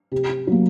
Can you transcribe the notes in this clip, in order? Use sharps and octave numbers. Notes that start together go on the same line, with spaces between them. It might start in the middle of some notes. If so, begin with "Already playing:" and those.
C3
F#3 A#3